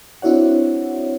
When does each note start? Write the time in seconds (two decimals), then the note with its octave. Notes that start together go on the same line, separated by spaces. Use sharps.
0.22 C4 D4 E4 F#4 C#5 F#5